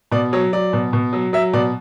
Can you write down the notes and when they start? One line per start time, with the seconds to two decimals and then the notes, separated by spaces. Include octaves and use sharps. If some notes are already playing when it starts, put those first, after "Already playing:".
0.12 B2 D5
0.33 F#3 C#5
0.53 F#3 D5
0.73 B2
0.93 B2
1.13 F#3
1.33 F#3 E5
1.53 B2 D5